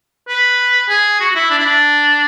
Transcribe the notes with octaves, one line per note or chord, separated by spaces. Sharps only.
B4
G#4
F#4
F#4
E4
D4
E4
D4